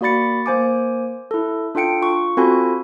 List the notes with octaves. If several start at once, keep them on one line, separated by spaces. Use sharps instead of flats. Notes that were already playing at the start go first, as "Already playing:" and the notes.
A#3 F#4 D5 B5 A6 C#7
A#3 C5 G#5 D6
E4 A4
D4 F4 A4 G5 C#7 D7
F4 C#6
C4 F4 F#4 A4 G#5 B5